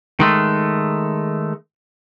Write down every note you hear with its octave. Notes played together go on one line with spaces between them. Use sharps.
D#3 G#3 A3